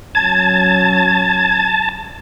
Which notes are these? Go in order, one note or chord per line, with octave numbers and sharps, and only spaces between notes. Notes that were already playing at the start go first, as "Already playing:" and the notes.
F#3 C#4 A5 G#6